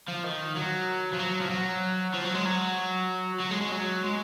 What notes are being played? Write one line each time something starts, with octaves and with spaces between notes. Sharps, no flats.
F3
D#3
F#3
F3
F#3
F3
F#3
F3
F#3
G#3
F#3
F#3
G#3
G#3
F#3
G#3